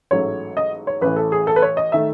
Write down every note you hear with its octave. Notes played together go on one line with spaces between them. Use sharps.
A1 G#2 F#3 A3 C#5
D#5
C#5
A1 A2 E3 B4
A4
G#4
A4
B4
C#5
D#5
D#3 A3 E5